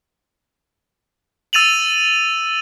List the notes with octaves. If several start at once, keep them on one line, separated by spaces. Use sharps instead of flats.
E6 A6 D#7 F7 F#7